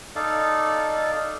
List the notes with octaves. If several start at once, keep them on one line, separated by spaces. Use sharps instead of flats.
D#4 A4 D5 F5